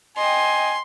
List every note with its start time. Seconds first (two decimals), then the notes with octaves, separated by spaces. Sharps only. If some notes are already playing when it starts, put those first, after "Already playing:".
0.18 D#5 G5 G#5 C6